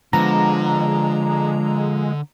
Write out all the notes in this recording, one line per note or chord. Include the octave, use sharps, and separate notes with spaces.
D3 F3 G#3 B3 A#5